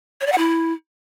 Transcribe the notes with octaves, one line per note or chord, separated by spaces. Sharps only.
C#5
D5
F#5
E4